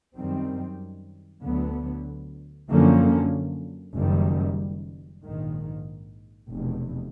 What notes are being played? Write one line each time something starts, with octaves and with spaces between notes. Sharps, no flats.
F#2 D#3 G3 C4
D2 D3 F#3 B3
F#2 D3 F3 A#3 C#4
F#1 F#2 D#3 G3
A#1 G#2 D#3
F1 E2 B2